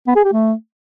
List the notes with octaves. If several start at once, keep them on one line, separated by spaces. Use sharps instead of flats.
B3
G#4
G4
A3